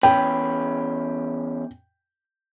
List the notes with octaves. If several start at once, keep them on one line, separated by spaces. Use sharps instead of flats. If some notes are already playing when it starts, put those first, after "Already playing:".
E2 C#4 B4 G5